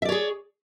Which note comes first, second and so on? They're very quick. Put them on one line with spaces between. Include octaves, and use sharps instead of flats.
E5 D5 C#5 G#4